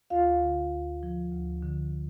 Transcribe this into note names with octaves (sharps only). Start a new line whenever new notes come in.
D2 F4 F5
D3
D2
F3
D2
D3